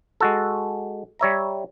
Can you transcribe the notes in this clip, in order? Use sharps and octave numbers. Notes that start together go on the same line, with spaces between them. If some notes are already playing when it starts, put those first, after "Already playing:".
G#3 F#4 A4
G3 C#5 E5 A#5